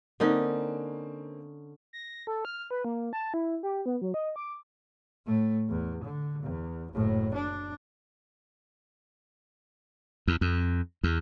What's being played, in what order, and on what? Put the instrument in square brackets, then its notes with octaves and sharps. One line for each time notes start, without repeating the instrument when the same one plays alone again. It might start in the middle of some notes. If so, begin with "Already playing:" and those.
[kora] D3 C#4 D#4 [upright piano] A#3 C4
[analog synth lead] A#6
A4
F6
B4
A#3
A5
E4
G4
B3
F#3
D#5
D6
[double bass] A2 A3
E2
D3
E2
F#1 A2
D4
[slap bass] E2
F2
E2